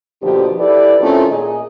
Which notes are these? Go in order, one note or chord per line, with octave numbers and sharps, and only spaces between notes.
D#2 B2 D3 F3 G4
E4 G4 A4 B4 D5
D#3 A3 C4 C#4 E4 F4
A#2 G#4 D#5